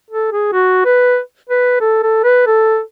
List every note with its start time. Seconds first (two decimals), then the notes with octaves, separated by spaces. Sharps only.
0.10 A4
0.32 G#4
0.52 F#4
0.85 B4
1.49 B4
1.81 A4
2.03 A4
2.24 B4
2.46 A4